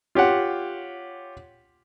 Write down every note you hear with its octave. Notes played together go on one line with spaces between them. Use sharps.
F4 G4 C#5 F#5